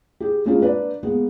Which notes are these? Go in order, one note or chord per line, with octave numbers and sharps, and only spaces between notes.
G4 G#4
G#3 A#3 C4 C#4 E4 F4
A#3 D4 B4 D5
G#3 A#3 B3